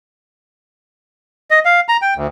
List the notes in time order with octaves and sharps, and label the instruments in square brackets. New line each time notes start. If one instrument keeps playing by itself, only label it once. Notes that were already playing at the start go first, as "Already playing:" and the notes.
[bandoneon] D#5
F5
A#5
G5
D2